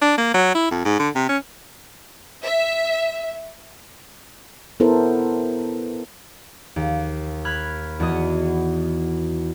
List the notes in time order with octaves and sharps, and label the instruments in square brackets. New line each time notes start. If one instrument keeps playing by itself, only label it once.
[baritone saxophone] D4
A#3
F#3
E4
F2
G#2
D3
C3
C#4
[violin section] E5
[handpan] B3 E4 A4 A#4 C5
[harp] D#2
B5 F6 F#6 G#6
E2 B3 F#4 D#5